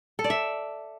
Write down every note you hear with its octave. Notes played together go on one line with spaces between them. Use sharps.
A4
D5
E5